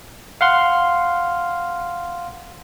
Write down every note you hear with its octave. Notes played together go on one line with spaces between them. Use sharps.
F5 F#5 C6 F6